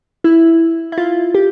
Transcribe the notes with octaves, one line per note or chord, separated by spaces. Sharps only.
E4
E4
F4
G4